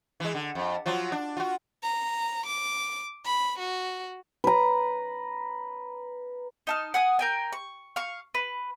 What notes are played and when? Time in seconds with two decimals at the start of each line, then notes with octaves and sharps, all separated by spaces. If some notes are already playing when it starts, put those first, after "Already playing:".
0.20 E3 G#3
0.34 D3
0.55 F2
0.86 F3 F#3 F4
1.12 D4
1.37 F4 F#4
1.83 A#5
2.47 D6
3.25 B5
3.59 F#4
4.44 B4 A#5
6.67 D#4 A5 F6
6.94 F#5 G#5 D#6
7.19 A#4 G5 G#5
7.53 C#6
7.96 F5 C#6
8.35 B4